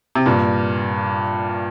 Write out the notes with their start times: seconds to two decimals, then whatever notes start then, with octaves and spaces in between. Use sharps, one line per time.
0.15 C3
0.26 G2 A#2